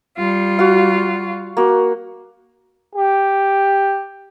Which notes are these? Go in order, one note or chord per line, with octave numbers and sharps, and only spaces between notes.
G3 F4
F#4 F5
A#3 F#4
G4